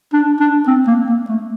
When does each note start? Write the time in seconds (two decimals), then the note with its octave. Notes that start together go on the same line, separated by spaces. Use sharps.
0.13 D4
0.40 D4
0.67 C4
0.88 A#3
1.09 A#3
1.29 A3